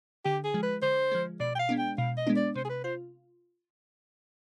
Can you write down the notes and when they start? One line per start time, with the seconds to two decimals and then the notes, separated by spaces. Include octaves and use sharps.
0.25 D3 G4
0.44 G#4
0.54 F3 G#3
0.63 B4
0.82 D3 C5
1.12 F3 G#3
1.40 B2 D5
1.55 G5
1.59 F5
1.69 G#3 B3 D4
1.79 G5
1.98 B2 F5
2.17 D#5
2.27 G#3 B3 D4
2.36 D5
2.56 C3 C5
2.65 G#4
2.70 B4
2.84 F4 C5